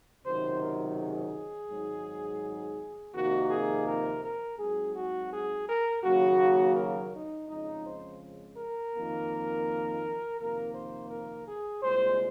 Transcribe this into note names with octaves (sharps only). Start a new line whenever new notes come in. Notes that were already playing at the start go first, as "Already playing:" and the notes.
C#2 C3 D#3 F#3 C5
A#4
G#4
G#1 G#2 F#3
F2 C3 D#3 A#3 F#4
G#4
A#4
A#4
G#2 F#3 C4 G#4
F#4
G#4
A#4
D#2 C#3 F#3 A#3 F#4
A#4
D#4
F2 C#3 G#3 D#4
C5
A#4
F2 D#3 A#3
F2 C3 D#3 A#3 A#4
C5
A#4
G#4
C2 A#2 G#3 C5